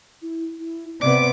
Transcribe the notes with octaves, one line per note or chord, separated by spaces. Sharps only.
E4
E4
C3 B3 D5 D6